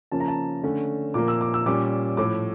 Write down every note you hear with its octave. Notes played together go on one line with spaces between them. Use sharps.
C#3 F3 A#3 C#4 A5
A#5
A5
D3 A3 C#4
A#2 F3 A#3 D6
E6
D6
E6
A#2 G3 C#4 D6
A2 F3 A3 D6